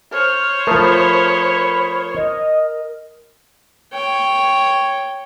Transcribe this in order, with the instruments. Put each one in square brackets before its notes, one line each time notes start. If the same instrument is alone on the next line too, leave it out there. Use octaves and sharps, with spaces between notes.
[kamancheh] C5 C#5 [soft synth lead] F6
[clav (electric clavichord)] F3 A3 [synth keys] A#4 D#6 F6 [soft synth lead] B5
[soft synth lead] D#5
[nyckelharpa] C#5 G5